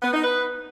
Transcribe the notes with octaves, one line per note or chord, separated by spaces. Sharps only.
B3
D#4
B4